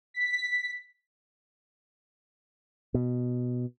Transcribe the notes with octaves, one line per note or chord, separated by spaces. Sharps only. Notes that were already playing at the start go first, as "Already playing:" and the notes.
B6
B2